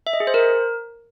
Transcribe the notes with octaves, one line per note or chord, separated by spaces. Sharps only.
E5
D#5
G#4
C5
A#4